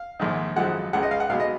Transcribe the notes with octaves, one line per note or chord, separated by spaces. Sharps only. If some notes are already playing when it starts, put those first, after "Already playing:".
Already playing: F5
A#1 G#2 D#3
G#1 F#2 F3 G#3 F#5
C#2 C#3 G#3 F#5
D#5
F5
F#5
B1 B2 G#3 F5
D#5